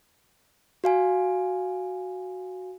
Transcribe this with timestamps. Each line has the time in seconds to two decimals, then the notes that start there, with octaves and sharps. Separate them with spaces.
0.84 F#4 F5 G#5